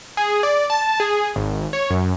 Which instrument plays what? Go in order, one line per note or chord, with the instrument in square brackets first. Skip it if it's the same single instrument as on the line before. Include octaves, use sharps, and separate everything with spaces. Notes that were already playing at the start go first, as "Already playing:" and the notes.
[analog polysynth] G#4
D5
A5
G#4
G#1
C#5
F#2